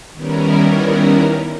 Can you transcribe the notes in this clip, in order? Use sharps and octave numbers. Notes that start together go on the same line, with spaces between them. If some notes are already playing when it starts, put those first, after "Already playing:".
D#3 G3 B3 C#4 E4 A#4